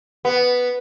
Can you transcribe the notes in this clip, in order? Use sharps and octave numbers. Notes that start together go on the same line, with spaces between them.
B3